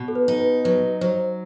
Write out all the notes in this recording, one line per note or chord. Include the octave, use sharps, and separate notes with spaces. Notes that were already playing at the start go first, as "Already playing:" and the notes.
Already playing: B2
A4
B4
D#4
B4
F#3 B4
F#3 C5